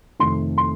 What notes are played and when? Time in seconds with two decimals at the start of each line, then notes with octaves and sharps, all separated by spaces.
0.19 F2 C3 D#3 A3 C4 C6
0.58 C6